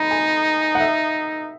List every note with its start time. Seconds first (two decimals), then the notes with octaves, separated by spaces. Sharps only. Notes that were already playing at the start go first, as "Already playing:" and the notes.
Already playing: D#4 A#5 B5
0.11 G#5
0.75 F#5
0.80 E5